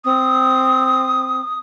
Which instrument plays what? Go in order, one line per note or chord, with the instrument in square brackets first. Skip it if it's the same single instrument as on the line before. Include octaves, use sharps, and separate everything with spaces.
[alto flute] C4 [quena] D#6